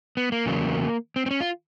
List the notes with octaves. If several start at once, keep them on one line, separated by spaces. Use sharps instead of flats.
B3
A#3
E2 C#3 F#3
C4
C4
C#4
F4